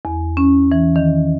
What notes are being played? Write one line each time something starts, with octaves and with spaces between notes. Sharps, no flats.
E2
C#4
E3
D#3